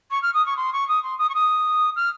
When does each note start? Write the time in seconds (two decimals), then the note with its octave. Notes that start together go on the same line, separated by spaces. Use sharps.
0.10 C#6
0.22 F6
0.33 D#6
0.46 C#6
0.56 C6
0.72 C#6
0.88 D#6
1.02 C6
1.18 D#6
1.29 C#6
1.34 D#6
1.95 F6